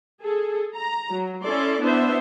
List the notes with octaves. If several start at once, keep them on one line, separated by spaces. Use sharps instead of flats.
G#4 A4
A#5
F#3
C#4 E4 A4 D5 C6
B3 D4 E4 C5 E5